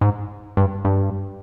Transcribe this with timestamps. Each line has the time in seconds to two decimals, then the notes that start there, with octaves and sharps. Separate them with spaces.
0.01 G#2
0.57 G2
0.85 G2